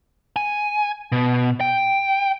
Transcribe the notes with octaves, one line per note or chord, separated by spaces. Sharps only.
G#5
B2
G5